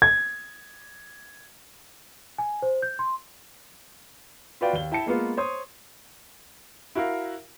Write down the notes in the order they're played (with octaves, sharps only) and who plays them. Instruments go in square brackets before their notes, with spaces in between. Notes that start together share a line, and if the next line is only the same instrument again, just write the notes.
[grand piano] G#6
[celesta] G#5
C5
G6
C6
[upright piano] F4 F#4 B4 D5 F5 G5
D#2 G7
E4 G5 A5 C#7
G#3 A#3 B3 F4
C5 C#5 C6 D#6
E4 F#4 A#4 F5